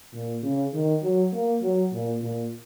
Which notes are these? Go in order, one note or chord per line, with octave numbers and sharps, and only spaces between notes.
A#2
C#3
D#3
F#3
A#3
F#3
A#2
A#2